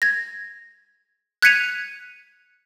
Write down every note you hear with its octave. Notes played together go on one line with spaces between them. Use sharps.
G#6 A#6
F#6 G#6 B6 C#7 D#7 F7